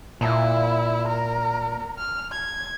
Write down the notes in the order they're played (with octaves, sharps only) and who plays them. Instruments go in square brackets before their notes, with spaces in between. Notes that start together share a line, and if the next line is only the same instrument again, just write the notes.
[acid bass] A#2 [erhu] E4
[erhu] A#4
F6
G#6